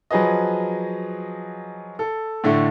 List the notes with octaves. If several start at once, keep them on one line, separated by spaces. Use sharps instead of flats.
F3 F#3 G#4 B4 D#5
A4
A2 D3 A3